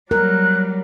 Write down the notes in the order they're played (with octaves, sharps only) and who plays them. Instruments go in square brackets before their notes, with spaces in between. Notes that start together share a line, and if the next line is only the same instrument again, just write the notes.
[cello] F#3 G3 [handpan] A#4 [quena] F#6